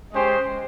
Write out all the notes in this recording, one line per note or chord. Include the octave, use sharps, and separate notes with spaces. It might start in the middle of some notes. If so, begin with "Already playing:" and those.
G#3 C#4 G4 C5 D#5